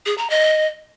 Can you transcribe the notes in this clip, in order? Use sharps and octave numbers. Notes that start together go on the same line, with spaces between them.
G#4
A#5
D#5